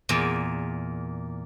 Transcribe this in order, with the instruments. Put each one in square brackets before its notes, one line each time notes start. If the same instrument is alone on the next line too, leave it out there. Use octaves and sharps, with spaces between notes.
[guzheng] E2 A#2